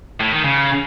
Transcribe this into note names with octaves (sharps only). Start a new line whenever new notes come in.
A2
D#3
C#3